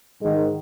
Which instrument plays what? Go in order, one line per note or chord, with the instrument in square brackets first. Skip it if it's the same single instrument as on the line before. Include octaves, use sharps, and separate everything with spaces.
[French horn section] G#2 D#3 G#3